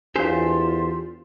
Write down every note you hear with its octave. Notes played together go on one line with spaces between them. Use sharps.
E2 D4 F4 G4 A4 C5 C#5 F5